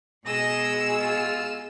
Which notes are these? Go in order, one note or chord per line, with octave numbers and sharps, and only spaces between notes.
B2 G#3 G#4 D#5 E6
F4